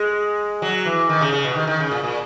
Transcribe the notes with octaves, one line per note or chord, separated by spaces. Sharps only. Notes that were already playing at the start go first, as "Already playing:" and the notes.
Already playing: G#3
F#3
E3
D#3
C#3
C#3
B2
D#3
D#3
C#3
A#2
A#2